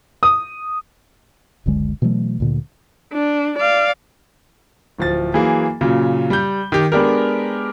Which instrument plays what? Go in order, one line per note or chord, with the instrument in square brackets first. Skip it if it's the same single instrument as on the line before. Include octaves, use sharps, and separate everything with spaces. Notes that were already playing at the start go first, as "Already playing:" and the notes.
[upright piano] D#6
[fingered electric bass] F#1 C#2 D3 G#3
B2 E3 F#3 A3
D2 A#2 D3
[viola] D4
D5 F5
[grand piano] D1 F3 A6
E3 F#3 A#3 G#4
A#2 C#3 F#3
G3 G6
D#3 G4
G#3 B3 D4 G4 A#4